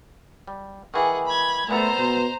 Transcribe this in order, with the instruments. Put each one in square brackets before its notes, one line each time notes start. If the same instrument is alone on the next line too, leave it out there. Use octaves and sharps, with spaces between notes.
[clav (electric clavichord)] G3
[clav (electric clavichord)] D#3 E3 [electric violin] G#4 F#5
[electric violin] B5 G#6
[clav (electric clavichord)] A#2 B3 A4 [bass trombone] A3 [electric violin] C5 A#5
[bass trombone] B2